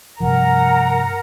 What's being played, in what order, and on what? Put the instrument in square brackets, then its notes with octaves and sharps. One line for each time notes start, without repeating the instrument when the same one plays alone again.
[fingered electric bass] G2 C3 F3 [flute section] A#4 F#5 [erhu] A#5